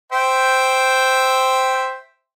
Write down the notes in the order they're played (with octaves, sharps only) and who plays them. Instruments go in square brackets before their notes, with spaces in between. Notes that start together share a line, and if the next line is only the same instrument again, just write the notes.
[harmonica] C5 E5 G5